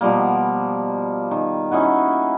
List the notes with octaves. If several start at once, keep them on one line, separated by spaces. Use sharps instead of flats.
B2 F3 G3 A#3
D#3
C#4 D#4 E4 F#4